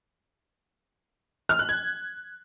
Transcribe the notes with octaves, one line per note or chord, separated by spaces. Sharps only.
F6
F#6
G#6